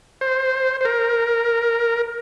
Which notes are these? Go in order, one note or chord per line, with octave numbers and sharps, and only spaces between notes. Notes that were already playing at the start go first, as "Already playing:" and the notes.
C5
C5
A#4